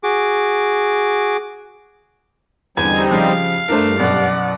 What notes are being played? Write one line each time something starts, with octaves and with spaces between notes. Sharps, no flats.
F#4 G#4 D6
E2 D3 G3 C4 D#4 G#5
C#3 F3 G4 F5
G2 A3 D4 A#4 C5
F#2 B2 D5 F#5